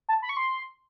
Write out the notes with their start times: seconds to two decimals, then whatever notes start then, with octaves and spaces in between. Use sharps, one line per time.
0.09 A5
0.22 B5
0.29 C#6
0.37 C6